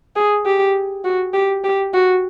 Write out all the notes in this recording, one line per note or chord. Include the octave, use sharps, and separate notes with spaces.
G#4
G4
F#4
G4
G4
F#4